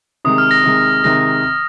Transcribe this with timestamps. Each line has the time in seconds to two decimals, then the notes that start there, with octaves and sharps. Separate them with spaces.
0.25 C3 D#3 G#3 D#6
0.38 F6
0.51 A#6
0.64 C3 D#3 G#3
1.04 C3 D#3 G#3 A#6